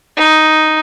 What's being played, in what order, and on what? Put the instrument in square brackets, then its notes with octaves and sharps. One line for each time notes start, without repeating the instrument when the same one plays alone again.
[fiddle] D#4